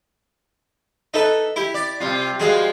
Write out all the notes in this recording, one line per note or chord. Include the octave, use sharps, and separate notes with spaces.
D#4 A4 B4 E5
E4 G4
D5
C3 G3 F4
F3 G3 G#3 F#4 G#4 F5